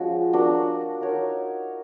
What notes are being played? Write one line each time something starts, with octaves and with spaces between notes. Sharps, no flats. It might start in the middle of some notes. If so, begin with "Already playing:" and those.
Already playing: F3 G#3 C#4 F#4
D4 F#4 A#4
D#4 F#4 A#4 C#5